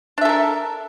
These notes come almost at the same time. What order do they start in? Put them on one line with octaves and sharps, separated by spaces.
D4 E5 A4 A#4